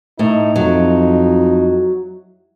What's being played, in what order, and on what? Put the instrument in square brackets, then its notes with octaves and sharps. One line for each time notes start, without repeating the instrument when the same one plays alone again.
[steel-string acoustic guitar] A2 [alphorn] D#4
[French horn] F2 [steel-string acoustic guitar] F#3